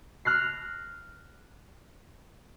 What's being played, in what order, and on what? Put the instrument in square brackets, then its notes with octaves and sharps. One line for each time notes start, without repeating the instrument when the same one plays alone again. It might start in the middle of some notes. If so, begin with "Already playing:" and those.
[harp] F6 F#6 A#6 C7